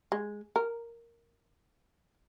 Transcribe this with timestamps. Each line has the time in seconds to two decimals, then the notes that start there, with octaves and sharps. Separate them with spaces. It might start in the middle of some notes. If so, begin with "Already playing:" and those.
0.12 G#3
0.56 A#4